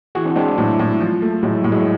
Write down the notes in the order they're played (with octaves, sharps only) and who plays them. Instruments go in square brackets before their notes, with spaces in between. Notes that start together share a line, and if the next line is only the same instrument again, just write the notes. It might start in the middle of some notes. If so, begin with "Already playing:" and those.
[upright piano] E3 [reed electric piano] F#4 G#4
[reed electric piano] C4 D4
[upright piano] G#3 [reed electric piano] C4 D4
[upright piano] A2 [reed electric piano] F#3 G#3
[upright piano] A2
F3
A3
[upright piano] A2 [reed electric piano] F#3 G#3
[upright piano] A2 [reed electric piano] G3
[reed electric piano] F#3 G#3